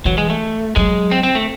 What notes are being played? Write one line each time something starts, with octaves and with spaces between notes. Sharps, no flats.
E3 F#3
G#3
A3
F#3 G#3
C4
C4
A3